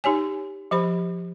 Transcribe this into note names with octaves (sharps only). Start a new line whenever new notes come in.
D#4 G4 C#5 G#5
F3 G4 C5 B5